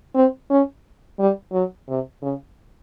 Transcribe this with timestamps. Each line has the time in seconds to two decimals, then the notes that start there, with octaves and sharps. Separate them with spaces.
0.15 C4
0.50 C#4
1.19 G3
1.52 F#3
1.88 C3
2.22 C#3